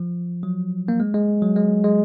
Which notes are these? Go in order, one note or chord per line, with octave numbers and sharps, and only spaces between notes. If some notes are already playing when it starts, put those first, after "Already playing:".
Already playing: F3
F#3
A#3
G#3
G#3
F#3
G#3
G#3